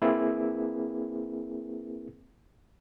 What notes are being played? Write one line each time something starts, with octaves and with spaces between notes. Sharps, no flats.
A#3 C4 E4 G#4 A#4 B4